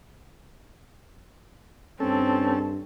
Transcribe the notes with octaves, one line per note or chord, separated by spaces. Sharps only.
G2 C4 C#4 A4